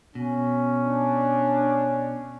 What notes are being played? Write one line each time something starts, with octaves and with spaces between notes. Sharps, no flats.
B2 C#4
D4